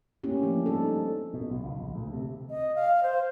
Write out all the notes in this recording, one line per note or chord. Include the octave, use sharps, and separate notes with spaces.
A3 A#3 C#4 E4 G4
F3 D4
G3 C4 D#4 A4
B2
B1
C#2
A#1
D2
C3
D#5
F5
C5